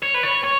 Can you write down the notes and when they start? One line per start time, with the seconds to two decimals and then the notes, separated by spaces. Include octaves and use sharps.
0.02 C#5
0.14 B4
0.23 C#5
0.44 C#5